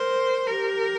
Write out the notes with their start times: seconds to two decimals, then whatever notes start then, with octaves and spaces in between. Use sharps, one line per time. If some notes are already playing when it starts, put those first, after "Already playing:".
Already playing: A#4 C5
0.47 G4 A#4